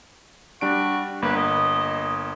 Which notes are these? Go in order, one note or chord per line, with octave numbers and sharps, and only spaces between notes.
G3 D4 F#4 D7
G1 A#3 B4
D#5